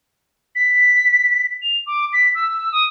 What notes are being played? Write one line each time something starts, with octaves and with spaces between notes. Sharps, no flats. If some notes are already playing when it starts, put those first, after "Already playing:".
B6
F7
D6
B6
E6
D#6